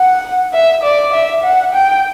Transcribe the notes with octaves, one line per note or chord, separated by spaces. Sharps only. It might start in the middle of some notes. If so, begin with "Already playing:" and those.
Already playing: F#5
E5
D5
E5
F#5
G5